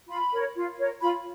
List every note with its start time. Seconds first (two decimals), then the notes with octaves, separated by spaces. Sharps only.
0.08 F4 B5
0.32 A#4 C#5
0.56 F4
0.78 A#4 C#5
1.02 F4 B5